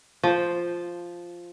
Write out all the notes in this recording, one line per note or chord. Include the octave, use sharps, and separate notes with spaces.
F3 C5